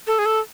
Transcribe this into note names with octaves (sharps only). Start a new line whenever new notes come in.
A4
G#4
A4